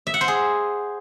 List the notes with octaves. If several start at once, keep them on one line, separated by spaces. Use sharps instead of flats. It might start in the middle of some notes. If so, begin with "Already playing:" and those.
E5
F#5
C5
G#4